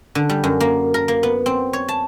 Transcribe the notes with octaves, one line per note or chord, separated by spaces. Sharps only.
D3
G3
F#2
A#3
A#4
A#3
B3
C4
C#5
A5